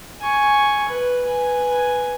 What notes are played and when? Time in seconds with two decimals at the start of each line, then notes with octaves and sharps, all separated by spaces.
0.21 G#5 C#6
0.88 B4
1.24 B4 G#5